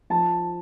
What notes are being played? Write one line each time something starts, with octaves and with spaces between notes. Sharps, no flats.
F3 A5